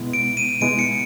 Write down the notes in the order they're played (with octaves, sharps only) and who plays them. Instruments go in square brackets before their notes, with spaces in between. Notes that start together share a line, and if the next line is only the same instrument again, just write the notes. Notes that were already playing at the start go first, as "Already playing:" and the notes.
Already playing: [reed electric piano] B2 G#3 B3 E4
[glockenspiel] D7
D#7
[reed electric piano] B2 G#3 B3 E4 [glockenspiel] D7
[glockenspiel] C#7